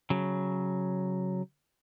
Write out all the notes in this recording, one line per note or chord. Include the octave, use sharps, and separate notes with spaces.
C#3 F#3